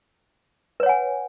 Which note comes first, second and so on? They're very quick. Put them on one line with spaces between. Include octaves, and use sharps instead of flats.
B4 C#5 F#5 G#5